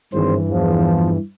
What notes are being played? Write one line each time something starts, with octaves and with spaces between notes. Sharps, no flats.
G#1 G2 E3 C5
E2 F3